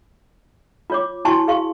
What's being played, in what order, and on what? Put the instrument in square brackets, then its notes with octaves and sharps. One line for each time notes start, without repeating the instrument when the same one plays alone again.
[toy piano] F4 C#5 D6
E4 F#4 G#5 A5 C6 C#6
G#4 F5 C#6